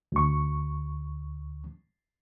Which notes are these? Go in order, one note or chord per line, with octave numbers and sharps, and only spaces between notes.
D2 C#6